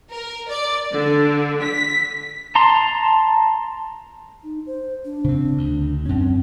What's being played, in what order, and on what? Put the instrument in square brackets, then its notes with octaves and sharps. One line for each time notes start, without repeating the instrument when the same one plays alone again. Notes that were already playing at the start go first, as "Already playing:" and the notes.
[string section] A#4
D5
D3
B6
[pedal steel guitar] A5 A#5 C6
[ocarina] D#4
C5
D4
[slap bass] C#3 C4
D2
[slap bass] F#2 C#4 [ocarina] C4